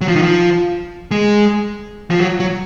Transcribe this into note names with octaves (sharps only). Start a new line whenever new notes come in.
F#3
F3
D#3
F3
G#3
F3
F#3
F#3